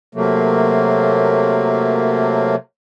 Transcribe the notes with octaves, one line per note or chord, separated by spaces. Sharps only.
C3 F#3 A3 A#3